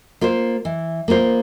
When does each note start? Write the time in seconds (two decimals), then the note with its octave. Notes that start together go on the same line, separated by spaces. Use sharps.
0.21 A#3 F4 C5
0.65 E3
1.08 A#3 F4 C5